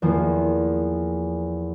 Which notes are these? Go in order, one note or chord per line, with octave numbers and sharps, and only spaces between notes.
E2 F3 A#3